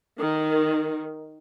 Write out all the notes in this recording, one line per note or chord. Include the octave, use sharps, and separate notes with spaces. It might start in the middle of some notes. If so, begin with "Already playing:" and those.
D#3